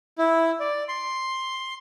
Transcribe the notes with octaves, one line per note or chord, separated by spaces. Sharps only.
E4
D5
C6